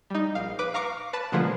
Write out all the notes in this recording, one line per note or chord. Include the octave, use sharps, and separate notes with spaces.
G3 D#4
A#1 F5
B4 D6
F5 A#5 C#6 D6 F6 C#7
B4 A5
B2 D3 F3 G#3 A#3 B3